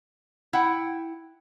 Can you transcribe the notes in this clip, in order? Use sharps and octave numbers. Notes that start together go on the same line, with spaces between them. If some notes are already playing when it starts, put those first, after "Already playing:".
E4 F#5 G5